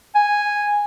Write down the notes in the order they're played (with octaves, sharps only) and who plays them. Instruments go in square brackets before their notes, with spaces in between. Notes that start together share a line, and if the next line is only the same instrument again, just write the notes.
[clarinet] G#5